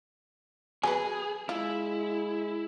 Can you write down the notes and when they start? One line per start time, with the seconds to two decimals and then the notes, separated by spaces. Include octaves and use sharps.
0.84 F#3 B3 G#4 B4 G#5
1.49 G#3 E4 F4